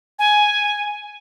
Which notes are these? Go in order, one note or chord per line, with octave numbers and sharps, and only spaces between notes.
G#5